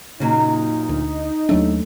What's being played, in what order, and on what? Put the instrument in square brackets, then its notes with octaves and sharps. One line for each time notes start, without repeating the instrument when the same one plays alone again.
[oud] F#2 A#2 F#3 [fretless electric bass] C#3 [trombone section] D#4
[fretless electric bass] D2
[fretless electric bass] D#2 F#3 D4 [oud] A3